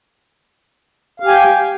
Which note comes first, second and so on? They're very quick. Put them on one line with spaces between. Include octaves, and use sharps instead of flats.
F5 G4 G#5 G5